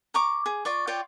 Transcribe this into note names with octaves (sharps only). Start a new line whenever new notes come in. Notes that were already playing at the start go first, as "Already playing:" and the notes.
A#5 C#6 D6
G#4
F4 D5 C#6
F4 C#5 D5 G5